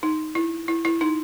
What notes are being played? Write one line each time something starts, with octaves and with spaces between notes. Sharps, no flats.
D#4
E4
E4
E4
D#4